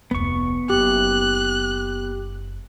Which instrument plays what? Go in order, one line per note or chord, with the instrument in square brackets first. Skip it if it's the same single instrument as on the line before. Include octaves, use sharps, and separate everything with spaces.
[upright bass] F1 D2 [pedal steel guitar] B3 C#6
[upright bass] F#1 [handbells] G4 [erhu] F#6